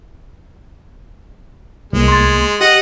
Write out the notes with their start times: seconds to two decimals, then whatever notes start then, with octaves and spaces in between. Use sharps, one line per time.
1.93 C2 G#3 A#3
2.08 C6 G#6 A6
2.61 G4 D#5 F#5 A#6